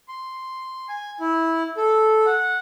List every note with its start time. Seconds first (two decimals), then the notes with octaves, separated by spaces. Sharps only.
0.08 C6
0.89 G#5
1.20 E4
1.77 A4
2.26 F#5